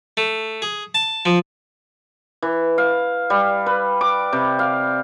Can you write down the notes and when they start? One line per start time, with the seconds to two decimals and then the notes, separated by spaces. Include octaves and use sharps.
0.17 A3
0.62 G#4
0.95 A5
1.26 F3
2.42 E3
2.78 F5
3.30 G3
3.66 B4
4.01 D6
4.33 C3
4.59 F5